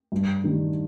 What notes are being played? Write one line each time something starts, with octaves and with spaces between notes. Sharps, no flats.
G2
D#3 G3